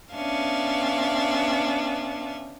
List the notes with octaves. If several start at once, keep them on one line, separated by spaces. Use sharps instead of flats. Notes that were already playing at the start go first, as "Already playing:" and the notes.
B3 C#4 D4 E5 F5